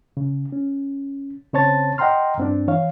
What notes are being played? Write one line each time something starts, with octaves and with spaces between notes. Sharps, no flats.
C#3
C#4
C#3 C4 C5 C#5 A5 A6
D#5 F#5 G5 A#5 C6 F6
G2 C4 D4
E3 C#5 F5